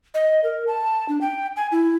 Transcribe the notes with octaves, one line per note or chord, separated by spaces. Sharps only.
D#5
A#4
A5
D4
G5
G#5
E4